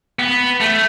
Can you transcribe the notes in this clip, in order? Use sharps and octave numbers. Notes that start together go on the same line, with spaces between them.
B3
A3